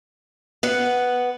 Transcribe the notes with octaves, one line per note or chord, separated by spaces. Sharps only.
B3 F#5